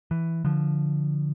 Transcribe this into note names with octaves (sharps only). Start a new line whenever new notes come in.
E3
D3 F3